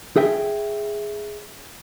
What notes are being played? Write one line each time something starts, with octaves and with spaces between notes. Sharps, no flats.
G#4 E5 G5